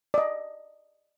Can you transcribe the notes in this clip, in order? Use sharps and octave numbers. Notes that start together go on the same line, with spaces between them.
D5 D#5